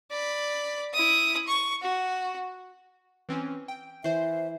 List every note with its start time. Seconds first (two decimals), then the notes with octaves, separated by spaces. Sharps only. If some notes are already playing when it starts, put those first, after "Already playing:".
0.11 D5 B5
0.94 E4 D#6
1.48 C#6
1.82 F#4
3.29 E3 C4 C#4
3.68 G5
4.04 E3 C5 E5 C7